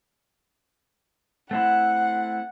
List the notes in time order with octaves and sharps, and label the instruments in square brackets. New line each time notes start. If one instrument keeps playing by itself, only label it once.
[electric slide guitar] A3 C4 E4 [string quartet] F#5